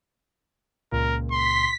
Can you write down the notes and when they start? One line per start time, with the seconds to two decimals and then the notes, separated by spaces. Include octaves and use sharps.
0.92 C#2 A#2 A#4
1.31 C6 B6